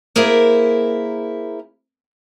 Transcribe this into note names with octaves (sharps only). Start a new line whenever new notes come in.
A#3 E4 G#4 A#4 C5